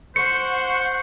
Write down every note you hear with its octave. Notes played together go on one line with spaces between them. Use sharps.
C5 F#5 C#6 C#7